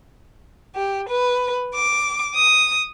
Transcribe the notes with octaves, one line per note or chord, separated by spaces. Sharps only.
G4
B4
D6
D#6